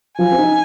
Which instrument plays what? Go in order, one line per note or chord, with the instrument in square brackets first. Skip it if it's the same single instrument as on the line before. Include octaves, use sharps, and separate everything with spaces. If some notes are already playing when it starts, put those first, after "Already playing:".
[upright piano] F3 [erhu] G#5
[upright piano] C4
D#4